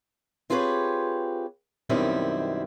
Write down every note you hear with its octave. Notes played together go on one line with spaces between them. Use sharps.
C4 F4 G4 G#4 B4 C#5
F#2 B2 D#3 G3 C4 E4